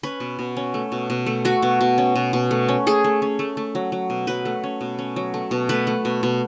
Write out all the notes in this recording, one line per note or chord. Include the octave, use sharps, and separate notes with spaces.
C#4 B4
B2
B2
C#4
A3
B2
B2
A3
A3 F#4
B2
B2
C#4
B2
B2
A3
C#4
A3 G#4
A3
C#4
A3
A3
F#3
F#3
B2
F#3 B4
A3
C#4
B2
C#4
F#3
A3
B2
A3 B4
A3
B2
B2